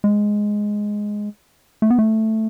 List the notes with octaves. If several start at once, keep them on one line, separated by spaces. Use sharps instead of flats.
G#3
A3
B3
A3